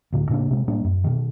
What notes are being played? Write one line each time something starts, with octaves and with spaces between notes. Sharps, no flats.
D2 A2 D3
A2 C#3 A#3 D4
C3 G#3
A2 G3 A#3 D4
F#2
B2 D#3